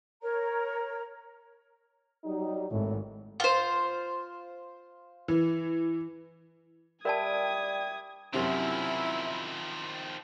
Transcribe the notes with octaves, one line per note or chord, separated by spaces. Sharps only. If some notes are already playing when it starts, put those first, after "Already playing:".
A#4 C#5 A#5
F#3 G3 D#4
G#1 A2
F4 C5
E3
G3 A#4 D5 E5 G5 A5 D#6 G#6
F#2 C3 D#3 F3 C4 E4